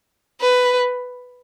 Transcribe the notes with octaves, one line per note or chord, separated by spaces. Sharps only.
B4